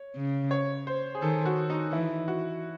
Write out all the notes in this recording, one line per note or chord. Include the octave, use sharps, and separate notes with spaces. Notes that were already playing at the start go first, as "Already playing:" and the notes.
Already playing: C#5
C#3
C#5
C5
G#4
D#3 A4
F#4
D#4
E3 E4
F#4